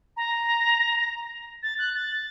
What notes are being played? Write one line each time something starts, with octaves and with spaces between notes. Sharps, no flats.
A#5
A6
F#6
A6